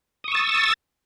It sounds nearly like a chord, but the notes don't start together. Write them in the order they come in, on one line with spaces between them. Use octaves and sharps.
D#6 C#6 E6 A6